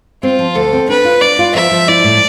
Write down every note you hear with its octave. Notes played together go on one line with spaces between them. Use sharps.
C4 F4
F3
D2 A4
C4
D4 B4
F4
D4 D5
F4
F3 E5
F3
E4 D5
A2